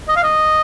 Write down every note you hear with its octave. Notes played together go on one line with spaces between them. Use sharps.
D#5
F5
D#5